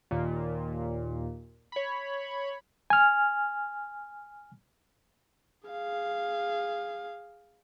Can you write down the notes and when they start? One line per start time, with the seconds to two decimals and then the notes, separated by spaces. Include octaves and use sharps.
0.11 D#2 A#2
1.72 C#5 B5
2.90 G#5 F6
5.69 G#4 F5